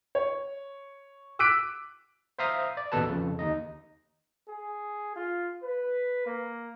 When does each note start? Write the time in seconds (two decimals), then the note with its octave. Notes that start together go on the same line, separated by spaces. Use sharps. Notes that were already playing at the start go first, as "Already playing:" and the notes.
0.15 C#5
1.39 D6 E6 F#6 B6 D7
2.39 C5 E5 F5 A#5 D#6
2.77 D5
2.92 A1 D#2 B2 A4 B4 A5
3.08 F2 C#3
3.39 D#2 D#4 D#5
4.48 G#4
5.16 F4
5.63 B4
6.26 A#3